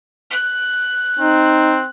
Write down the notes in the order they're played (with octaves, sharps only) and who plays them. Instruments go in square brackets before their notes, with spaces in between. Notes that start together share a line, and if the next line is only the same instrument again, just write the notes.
[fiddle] F#6
[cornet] C4 [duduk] D#4